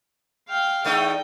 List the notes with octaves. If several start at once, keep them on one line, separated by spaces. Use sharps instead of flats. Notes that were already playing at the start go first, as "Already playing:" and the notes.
F5 G5
E2 A3 D#4 G5